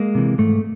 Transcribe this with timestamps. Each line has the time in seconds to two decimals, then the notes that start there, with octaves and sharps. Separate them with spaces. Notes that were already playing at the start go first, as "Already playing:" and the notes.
Already playing: G#3 A#3
0.15 C3 E3
0.38 G#2 A3